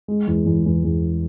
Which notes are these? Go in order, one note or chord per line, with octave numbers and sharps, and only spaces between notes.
G#3
E2
E2
E2
E2